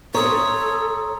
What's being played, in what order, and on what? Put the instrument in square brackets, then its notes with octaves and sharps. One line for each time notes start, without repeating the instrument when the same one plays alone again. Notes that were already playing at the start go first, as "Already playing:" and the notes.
[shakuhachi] A4 [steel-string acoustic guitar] C#5 [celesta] A#5 C6 D#6